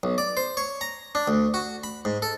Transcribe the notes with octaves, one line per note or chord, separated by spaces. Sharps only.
B1
D5
C5
C#5
A#5
D4
D2
F#4
B5
G#2
A4